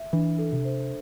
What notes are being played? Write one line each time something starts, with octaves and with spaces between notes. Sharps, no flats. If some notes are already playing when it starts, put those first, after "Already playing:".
Already playing: E5
E3 D4
A4
C3
C5